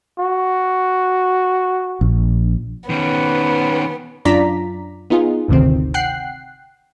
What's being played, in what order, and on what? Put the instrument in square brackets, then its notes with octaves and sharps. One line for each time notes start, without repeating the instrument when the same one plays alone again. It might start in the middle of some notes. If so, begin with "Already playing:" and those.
[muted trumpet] F#4
[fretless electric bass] A#1
[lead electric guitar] D#3 C#4 [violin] B3
[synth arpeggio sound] F#2 D4 F4 D5 A#5 B6
B3 D#4 F4 G#4
G1 D2 C3 D#3 C4
F#5 G5 F#6 C7